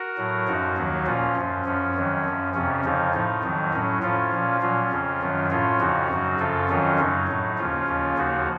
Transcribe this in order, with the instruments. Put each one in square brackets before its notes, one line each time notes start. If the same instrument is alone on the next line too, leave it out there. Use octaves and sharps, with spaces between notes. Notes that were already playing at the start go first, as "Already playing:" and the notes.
Already playing: [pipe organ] F#4 A#4
A2 F#3
F#2 F3 D#4 F#4
D#2 D#3 F#3
A#2 F3 C#4 F4
F#2 F3
F#2 F3 C#4
F2 D#3 F#3
F#2 F3
F2 C3 F3 C#4
F2 C#3 F3 D#4
A2 F3 D#4
F2 D#3 F#3
A2 F#3 C#4
A2 F3 C#4 F4
A#2 F3
A#2 F#3 C#4 F4
F2 C#3 F3
F#2 D#3 F#3
A2 F3 C#4 F4
F2 C#3 F3 D#4 F#4
F#2 C#3 F#3
F#2 C#3 F3 F4 A4
F2 D#3 F#3 C#4 F4
F#2 C#3 F#3 D#4
A2 F#3
D#2 C#3 F3 C#4 F4
D#2 C#3 F3
D#2 C#3 F3 D#4 F#4